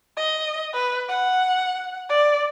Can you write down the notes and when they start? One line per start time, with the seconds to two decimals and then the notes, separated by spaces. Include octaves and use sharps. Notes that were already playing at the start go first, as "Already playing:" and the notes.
0.17 D#5
0.73 B4
1.09 F#5
2.09 D5